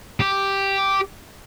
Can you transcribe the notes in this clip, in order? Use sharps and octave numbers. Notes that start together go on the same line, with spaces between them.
G4